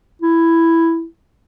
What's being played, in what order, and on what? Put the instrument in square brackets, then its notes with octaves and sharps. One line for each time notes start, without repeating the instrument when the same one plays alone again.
[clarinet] E4